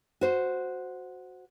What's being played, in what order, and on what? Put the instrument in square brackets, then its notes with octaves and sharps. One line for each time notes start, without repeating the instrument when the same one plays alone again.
[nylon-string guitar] F#4 C5